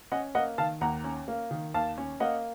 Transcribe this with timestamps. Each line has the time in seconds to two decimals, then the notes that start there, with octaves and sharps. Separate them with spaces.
0.12 C#4 D#5 F#5
0.35 A#3 D#5 F#5
0.58 D#3 F5 A5
0.81 D#2 F#5 A#5
1.04 C#4
1.28 A#3
1.51 D#3
1.74 D#2 F5 A5
1.98 C#4
2.20 A#3 D#5 F#5